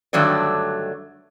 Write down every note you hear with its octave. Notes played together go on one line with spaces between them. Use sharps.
G2 D3 D#3 F#3 A3 D5